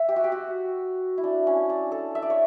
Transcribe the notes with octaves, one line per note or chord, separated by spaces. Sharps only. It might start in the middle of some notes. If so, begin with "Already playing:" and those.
Already playing: E5
G4
F#4
G4
F#4
E4
D4
C#4
D4
A4
E5
D5
C#5